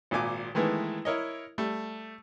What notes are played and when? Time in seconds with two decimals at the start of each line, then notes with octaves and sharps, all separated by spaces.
0.11 G#1 A#2 G#5 D6
0.55 D#3 E3 G#3 A3 B3
1.05 E4 A#4 C#5 D#5
1.58 G3 A3